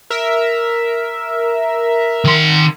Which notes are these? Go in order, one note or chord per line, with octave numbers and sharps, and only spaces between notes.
A#4 E5
D#3 C6